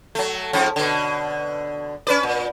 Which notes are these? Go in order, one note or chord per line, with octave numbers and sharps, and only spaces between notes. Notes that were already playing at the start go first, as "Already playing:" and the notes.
F#3 A3
G#2 F3 C#4
B2 D3
C#4 B4 D5
A#2